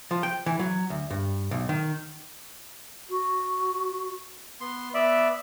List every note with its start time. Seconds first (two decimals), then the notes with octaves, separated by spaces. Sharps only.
0.11 F3
0.23 G5
0.46 E3
0.59 F#3
0.90 D2
1.10 G2
1.51 B1
1.69 D#3
3.10 F#4
4.61 B3 C6
4.94 B3 D5 E5